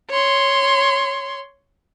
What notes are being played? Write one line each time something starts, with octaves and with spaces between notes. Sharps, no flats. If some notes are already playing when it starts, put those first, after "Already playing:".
C#5 C6